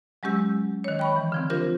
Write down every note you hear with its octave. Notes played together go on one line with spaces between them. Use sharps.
F#3 G#3 C#4 G4 E6
D#3 C#5
G5 B5 C#6
E3
D3 F3 C4
D4 F4 G4 A#4 C5